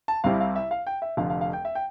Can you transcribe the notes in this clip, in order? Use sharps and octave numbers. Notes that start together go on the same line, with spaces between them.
A5
C2 C3 G3 C4 E4 F5
F5
E5
F5
G5
E5
F1 F2 D3 F5
F5
F5
G5
E5
G5